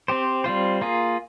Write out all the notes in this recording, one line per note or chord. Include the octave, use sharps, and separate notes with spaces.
C4 G4 C5
G3 C4 F4 C5
A#3 F4 G#4